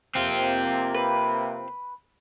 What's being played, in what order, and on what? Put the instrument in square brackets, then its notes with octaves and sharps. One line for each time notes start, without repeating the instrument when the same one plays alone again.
[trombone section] C3 A#3 [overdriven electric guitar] C4 F4
[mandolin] B4